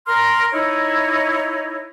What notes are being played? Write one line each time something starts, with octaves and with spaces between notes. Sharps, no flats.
A#4 A#5 C6 F6
D#4 E4 C#5